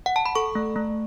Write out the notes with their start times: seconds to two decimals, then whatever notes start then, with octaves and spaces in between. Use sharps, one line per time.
0.06 F#5
0.16 A5
0.26 B5
0.35 A4 C#6
0.55 A3
0.76 A3